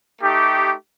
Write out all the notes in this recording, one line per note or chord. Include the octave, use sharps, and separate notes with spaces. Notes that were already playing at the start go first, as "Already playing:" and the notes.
A3 D#4 G4